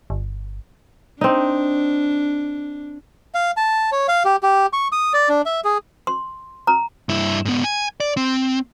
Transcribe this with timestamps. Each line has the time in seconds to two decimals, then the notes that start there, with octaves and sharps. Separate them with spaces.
0.10 G1
1.21 C4 D4 D#4
3.35 F5
3.57 A5
3.92 C#5
4.08 F5
4.25 G4
4.43 G4
4.73 C#6
4.92 D#6
5.14 D5
5.29 D4
5.46 E5
5.65 G#4
6.07 C6
6.67 A#5
7.09 G2 E4
7.45 G#2 B3
7.64 G#5
8.00 D5
8.17 C4